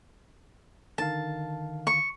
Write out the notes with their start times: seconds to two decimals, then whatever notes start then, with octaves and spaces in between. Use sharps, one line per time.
0.98 D3 D#3 F5 A5
1.87 C#6